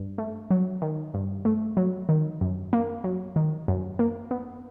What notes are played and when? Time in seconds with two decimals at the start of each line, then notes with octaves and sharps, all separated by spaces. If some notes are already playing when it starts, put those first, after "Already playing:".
Already playing: G2
0.18 A3
0.51 F#3
0.82 D#3
1.14 G2
1.45 A3
1.77 F#3
2.09 D#3
2.41 F#2
2.73 A#3
3.04 F#3
3.36 D#3
3.68 F#2
3.99 A#3
4.31 B3